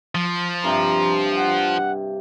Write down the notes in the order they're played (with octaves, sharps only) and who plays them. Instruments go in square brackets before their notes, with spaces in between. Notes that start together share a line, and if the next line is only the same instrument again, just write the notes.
[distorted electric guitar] F3
[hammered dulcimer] G2 C3 [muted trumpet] A#5
[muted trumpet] F#5